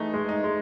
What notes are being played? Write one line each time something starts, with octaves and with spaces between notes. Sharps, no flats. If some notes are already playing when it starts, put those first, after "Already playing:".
Already playing: E3 G#3 A3 D#4
G#3
D#4
G#3